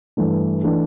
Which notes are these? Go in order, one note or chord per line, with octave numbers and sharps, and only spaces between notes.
G2 E3 A3 D4
E3 A3 D4